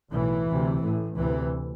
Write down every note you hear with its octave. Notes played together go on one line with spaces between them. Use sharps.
B1 A2 E3
D2 C3
A1 A2
D2 C3 E3